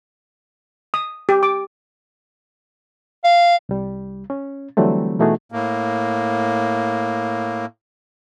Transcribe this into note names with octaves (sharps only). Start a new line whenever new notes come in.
D#6
G4
D6
F5
C2 G3
C#4
D3 E3 F#3 G3 A3 C4
B2 E3 A3 D#4 F#4 G#4
A2 A#3